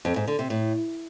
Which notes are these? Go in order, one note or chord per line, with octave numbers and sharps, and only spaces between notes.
F2
G#2
D3
C3
A2